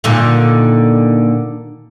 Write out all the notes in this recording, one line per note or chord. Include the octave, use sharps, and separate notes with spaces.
A#2 D3 D#3